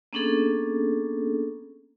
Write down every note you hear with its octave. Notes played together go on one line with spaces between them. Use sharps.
A#3 B3 C#4 D4 G#4 A4